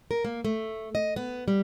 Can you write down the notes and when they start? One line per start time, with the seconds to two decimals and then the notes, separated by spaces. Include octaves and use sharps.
0.11 A#4
0.25 A#3
0.45 A3
0.95 D#5
1.16 B3
1.48 G3